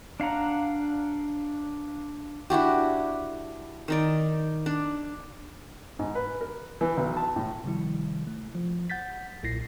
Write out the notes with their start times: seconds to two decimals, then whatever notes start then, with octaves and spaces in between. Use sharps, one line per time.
0.20 D4 F5 F#5 A#5
2.50 D4 E4 F#4 G4
3.88 D#3 D#4 D5
4.66 D4
5.99 G#2
6.15 B4
6.41 A#4
6.81 E3
6.97 B1
7.17 A5
7.36 A2
7.64 C3 D#3 F3 G3 E4
8.27 A3
8.55 F3
8.90 F#5 G6 A6 B6
9.43 B1 A#2 E4 A#6 C7